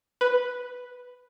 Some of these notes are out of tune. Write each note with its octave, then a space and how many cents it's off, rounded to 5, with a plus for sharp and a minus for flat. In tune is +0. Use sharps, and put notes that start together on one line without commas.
B4 +0